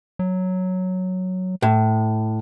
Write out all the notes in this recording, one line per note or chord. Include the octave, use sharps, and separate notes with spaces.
F#3
A2